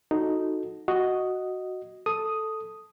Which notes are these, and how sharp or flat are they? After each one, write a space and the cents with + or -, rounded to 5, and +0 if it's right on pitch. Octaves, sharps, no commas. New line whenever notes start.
D#4 +0 F#4 -15 A4 +0
F#4 +0 D#5 +0
A4 +0 D#6 +0